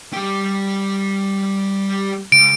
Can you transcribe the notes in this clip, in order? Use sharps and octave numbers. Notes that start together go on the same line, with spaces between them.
G3 G4
C#2 D7